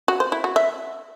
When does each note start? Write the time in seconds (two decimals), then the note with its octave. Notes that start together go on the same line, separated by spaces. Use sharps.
0.08 F#4
0.20 C5
0.32 E4
0.44 F#4
0.56 E5